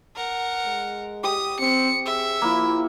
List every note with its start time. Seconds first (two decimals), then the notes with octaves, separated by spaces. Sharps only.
0.16 A#4 F#5
0.66 G#3
1.24 G4 D#6
1.60 C4 C#7
2.06 G#4 E5
2.42 F3 A#3 E4